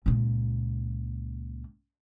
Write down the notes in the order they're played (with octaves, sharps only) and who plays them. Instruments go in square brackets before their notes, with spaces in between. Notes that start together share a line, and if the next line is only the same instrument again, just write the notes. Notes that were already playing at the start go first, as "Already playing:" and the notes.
[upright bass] C#2 A#2